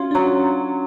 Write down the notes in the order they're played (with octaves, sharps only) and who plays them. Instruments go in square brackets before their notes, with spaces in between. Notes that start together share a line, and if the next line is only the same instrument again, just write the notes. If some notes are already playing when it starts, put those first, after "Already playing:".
Already playing: [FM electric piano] C#4 F#4 [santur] F4
[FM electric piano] D4
[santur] F#3 [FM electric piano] C#4